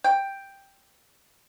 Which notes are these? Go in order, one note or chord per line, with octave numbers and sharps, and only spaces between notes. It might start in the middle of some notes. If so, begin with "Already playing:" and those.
G5